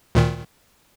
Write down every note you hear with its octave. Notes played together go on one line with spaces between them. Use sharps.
D2 A#2 D#3